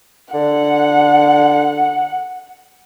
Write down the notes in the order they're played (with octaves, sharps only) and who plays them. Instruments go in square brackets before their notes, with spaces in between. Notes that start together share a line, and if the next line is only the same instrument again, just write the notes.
[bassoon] D3 [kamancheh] F#5